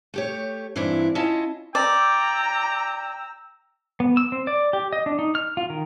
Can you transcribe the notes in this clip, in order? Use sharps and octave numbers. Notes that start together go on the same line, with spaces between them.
A3 G4 C#5
G2 E3 C4 D4 E4
C#4 E4 F4 D#5 A5
D5 G5 A#5 E6
B3
E6
C4
D5
G4
D#5
D4
D#4
F6
F4
D#3